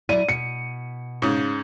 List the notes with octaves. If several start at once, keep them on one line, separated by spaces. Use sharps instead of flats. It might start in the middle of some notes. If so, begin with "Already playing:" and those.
F#3 E4 D5 D#7
B2 C#7
G#2 C#3